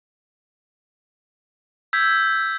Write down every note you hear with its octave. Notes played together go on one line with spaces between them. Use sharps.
E6 G6 G#6 B6